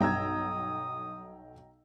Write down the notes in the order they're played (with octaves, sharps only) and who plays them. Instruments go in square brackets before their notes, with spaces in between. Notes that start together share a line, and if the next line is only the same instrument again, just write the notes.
[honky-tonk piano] B1 G#6 [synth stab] G2 [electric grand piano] G5 A#5 E6 [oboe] D#6